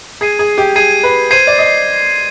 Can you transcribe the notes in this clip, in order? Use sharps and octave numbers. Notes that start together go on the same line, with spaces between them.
G#4 G#6 C7 D#7
G#4
G4
G#4 G#6 C7 D#7
B4
C5 G#6 C7 D#7
D5
D#5